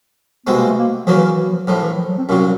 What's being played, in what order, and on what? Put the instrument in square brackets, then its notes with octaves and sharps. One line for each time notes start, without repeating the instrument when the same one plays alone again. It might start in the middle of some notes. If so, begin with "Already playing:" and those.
[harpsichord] C2 B2 G#3 C4 [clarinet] B3
[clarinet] A#3
A3
A#3
[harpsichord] E2 C#3 F#3 A#3 [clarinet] F3
[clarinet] E3
E3
F3
[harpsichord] A#1 A2 F3 [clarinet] F#3
[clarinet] E3
F3
F#3
C4
[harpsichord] C2 A#2 F#3 [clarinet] C#4